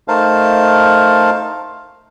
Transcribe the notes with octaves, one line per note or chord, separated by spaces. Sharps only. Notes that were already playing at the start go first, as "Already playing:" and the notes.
A3 D#4 A#4 C5 F5 A5